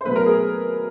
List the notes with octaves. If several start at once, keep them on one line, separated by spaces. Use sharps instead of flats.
C5
B2 F#3 A3 B4
A#4
G#4